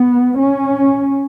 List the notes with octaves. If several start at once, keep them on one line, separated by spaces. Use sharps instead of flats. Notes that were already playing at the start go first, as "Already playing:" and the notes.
Already playing: B3
C#4